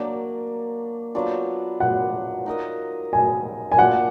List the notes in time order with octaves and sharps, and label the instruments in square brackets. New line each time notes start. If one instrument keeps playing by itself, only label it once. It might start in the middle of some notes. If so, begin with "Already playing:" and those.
Already playing: [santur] F#3 A#3 D4 [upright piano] D5
[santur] F#3 B3 D4 F4
[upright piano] F#5
[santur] D#4 A#4 D#5
[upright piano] G#5
G#5
[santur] A#3 D4 F4 [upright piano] F#5